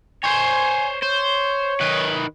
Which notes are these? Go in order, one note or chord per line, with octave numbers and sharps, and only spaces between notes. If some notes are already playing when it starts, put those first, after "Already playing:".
C5 C#5 G#5
C5 C#5
D#3 B4